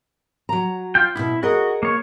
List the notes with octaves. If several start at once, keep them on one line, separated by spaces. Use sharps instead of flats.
F#3 A#5
F4 G5
D2 B2 E4
F#4 G#4 A#4 D#5
A#3 C#5